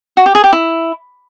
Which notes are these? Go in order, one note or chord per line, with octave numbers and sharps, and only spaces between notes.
F#4
G4
G#4
G4
E4